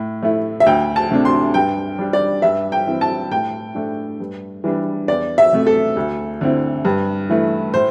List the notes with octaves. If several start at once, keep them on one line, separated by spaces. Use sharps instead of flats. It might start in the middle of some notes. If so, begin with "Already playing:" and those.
Already playing: A2
A3 E4
E5
D2 G5
A5
C3 A3 D4
C6
G2 G5
G3 D4
D5
G2 E5
G5
E3 C4 E4
A5
A2 G5
A3 D4
G2
E3 G3 D4
E2 D5
E5
C3 A3
A4
D2
D3 C4 E4
G2
E3 A3 E4
A2 C5